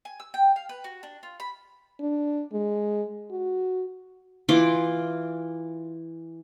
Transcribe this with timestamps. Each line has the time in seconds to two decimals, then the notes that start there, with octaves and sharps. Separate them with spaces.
0.05 G#5
0.20 E6
0.34 G5
0.56 F5
0.69 B4
0.84 F#4
1.03 D4
1.23 F4
1.40 B5
2.00 D4
2.53 G#3
3.31 F#4
4.49 E3 F4 C6 D6